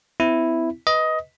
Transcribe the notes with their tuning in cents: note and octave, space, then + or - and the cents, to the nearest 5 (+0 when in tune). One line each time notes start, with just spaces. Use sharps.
C4 -45 E4 +0
B4 +0 D#5 +15